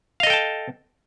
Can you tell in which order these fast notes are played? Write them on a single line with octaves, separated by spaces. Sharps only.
F5 D#5 A4 G5 A5